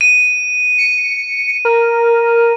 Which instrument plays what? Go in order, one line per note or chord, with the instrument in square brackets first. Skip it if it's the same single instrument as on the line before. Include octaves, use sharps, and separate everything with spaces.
[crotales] D#7
[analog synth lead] C#7
A#4